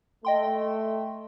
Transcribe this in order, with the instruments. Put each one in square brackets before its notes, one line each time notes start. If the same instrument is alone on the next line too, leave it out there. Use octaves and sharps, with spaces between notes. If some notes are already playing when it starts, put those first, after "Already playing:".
[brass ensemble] A3 [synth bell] D#5 G5 C6